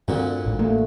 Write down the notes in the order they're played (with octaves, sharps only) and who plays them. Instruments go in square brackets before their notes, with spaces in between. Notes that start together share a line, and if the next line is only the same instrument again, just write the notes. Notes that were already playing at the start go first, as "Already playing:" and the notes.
[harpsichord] D2 A#2 D3 [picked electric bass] G2 C4
[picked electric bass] A1 G#2
[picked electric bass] A1 A#3 [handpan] A3